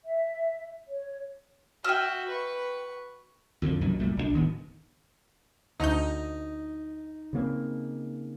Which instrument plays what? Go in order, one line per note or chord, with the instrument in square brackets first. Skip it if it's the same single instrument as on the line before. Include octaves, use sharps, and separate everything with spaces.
[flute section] E5
C#5
[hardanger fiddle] F#4 E5 [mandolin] G5 E6 [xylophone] F6 D#7
[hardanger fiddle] B4 C#6
[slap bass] F2 D3 D#3 F3
B1 F#2 A#2 D#3
A#2 G3 A3
B1 G3 D4
D1 D2 D#3 B3
[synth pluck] D2 G6 [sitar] D#4
[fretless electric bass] C#3 A#3 C4